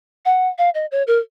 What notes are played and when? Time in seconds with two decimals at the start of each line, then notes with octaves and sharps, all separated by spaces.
0.25 F#5
0.58 F5
0.75 D#5
0.92 C#5
1.07 A#4